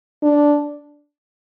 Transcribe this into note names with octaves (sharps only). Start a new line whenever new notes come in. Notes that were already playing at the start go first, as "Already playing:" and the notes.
D4